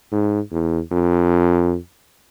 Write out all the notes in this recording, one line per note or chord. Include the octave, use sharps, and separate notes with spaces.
G#2
E2
F2